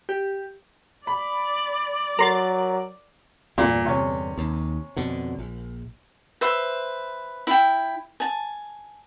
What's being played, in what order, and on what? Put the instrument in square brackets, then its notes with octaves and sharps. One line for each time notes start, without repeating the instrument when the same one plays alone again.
[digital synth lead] G4
[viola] D5 [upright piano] B5
[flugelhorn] F#3 [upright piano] A#4 [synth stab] A#5 C6 A6
[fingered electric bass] E2 G2 D3 [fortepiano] A#2
[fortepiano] C3 C#4
[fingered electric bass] D#2
F2 B2 D3
A#1
[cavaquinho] B4 C5 E5
E4 G5
G#5 A5